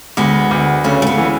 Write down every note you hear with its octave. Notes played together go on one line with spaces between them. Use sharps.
D2 G#3 B3
D2
C#3 A3 C#4
A3
G#3 B3
E3